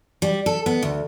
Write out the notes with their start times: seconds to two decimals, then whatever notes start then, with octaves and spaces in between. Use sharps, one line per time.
0.22 G3
0.46 A4
0.66 B3
0.83 D2